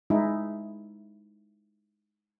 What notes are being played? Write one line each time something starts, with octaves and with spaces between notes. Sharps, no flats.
G#3 D#4 E4